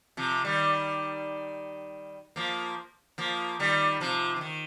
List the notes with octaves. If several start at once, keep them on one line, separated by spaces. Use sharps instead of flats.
C3 F3
D#3 G3
F3 A#3
F3 A#3
D#3 G3
C3 F3
F3
D#3